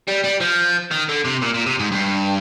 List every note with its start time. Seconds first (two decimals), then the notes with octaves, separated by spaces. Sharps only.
0.08 G3
0.24 G3
0.41 F3
0.91 D#3
1.09 D3
1.25 C3
1.42 A#2
1.54 A#2
1.66 C3
1.79 G#2
1.92 G2